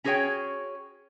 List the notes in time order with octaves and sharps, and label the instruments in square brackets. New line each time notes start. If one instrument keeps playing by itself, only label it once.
[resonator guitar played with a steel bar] C#4 F#4 G#4 A#4 C#5 G5